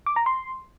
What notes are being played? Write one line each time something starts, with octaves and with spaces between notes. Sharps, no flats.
D6
A#5
C6